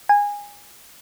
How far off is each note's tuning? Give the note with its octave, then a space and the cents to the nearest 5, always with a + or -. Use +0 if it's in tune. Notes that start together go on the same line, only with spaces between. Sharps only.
G#5 -20